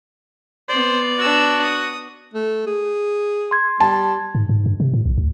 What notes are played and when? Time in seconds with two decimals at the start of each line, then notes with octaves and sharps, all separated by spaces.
0.69 B3 C5 D5
1.19 D4 F#4 E6
1.61 D#6
2.34 A3
2.67 G#4
3.51 C6 G#6
3.80 G3 A5
4.35 G#2
4.49 G#2
4.66 G2
4.80 C3
4.94 A2
5.06 B1
5.18 D2